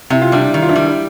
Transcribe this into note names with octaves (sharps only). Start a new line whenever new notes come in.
C3 E4
F4
G3 D4 E4
D#3 E4
F4
D4 E4
G3
E4